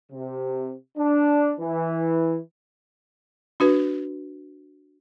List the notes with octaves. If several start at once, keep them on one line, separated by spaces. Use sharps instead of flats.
C3
D4
E3
D4 F#4 B4